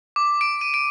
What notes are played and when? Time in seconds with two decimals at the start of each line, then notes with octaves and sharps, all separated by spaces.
0.16 D6
0.41 D7
0.61 D#7
0.74 D7